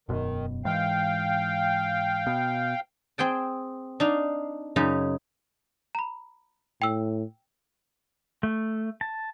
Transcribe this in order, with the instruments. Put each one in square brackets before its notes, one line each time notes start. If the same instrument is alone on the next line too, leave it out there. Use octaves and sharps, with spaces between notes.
[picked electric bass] E1 F#2 B2 [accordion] D#3
[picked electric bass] G#2 E3 [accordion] F5 G5
[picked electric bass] B2
[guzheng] C4 G#4 G5 A5
D4 D#4 F5
F#2 C#3 D#4
[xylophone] A#5 B5
[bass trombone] A2 [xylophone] G5 E6
[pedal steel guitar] A3
A5